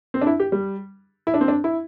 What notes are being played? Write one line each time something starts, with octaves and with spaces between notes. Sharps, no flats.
C4
D4
E4
G4
G3
E4
D4
C4
D4
E4